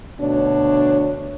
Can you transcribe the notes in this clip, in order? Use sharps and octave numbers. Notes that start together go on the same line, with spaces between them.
D2 B2 D4 C#5